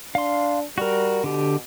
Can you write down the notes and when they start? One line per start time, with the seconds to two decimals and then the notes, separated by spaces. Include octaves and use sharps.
0.15 D4 F5 C6
0.78 G3 F#4 A#4
1.24 B2 D3 G4